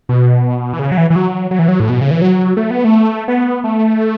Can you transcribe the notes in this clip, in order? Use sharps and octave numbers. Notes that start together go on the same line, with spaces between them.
B2
E3
C#3
F#3
E3
E3
F#3
F#3
E3
F#3
A2
B2
C#3
E3
F#3
A3
B3
A3
B3
A3